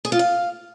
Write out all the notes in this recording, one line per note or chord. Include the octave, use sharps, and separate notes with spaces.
G#4
F4
F5